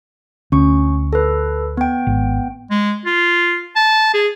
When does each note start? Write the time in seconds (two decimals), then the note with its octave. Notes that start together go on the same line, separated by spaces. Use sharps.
0.52 D2 C#4 C#6
1.13 A4 B4
1.77 B3 G5
2.07 G#1
2.71 G#3
3.06 F4
3.76 A5
4.14 G#4